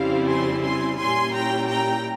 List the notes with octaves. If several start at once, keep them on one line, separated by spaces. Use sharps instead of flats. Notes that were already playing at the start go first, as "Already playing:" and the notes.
Already playing: F2 C#3 G3 C4 E4 F5
G#5 C6
G#5 C6
A#2 G3 C#4 E4 G#5 C6
G5 A#5
G5 A#5